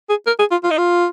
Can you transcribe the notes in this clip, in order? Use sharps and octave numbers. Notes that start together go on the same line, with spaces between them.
G#4
A#4
G#4
F4
F4
D#4
F4